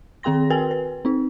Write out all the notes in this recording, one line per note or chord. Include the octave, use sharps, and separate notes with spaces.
D#3 C4 G#4 G5 C6 A#6
F#4 A#4 B4 G5 G#5
B4
C4 D#4